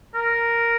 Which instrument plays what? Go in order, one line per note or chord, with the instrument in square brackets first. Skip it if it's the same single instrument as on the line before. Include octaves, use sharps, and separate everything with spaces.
[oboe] A#4